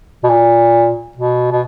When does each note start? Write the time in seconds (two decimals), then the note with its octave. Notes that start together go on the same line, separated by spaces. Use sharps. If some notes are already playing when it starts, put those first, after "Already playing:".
0.24 B2
0.30 A#2
1.17 B2
1.52 B2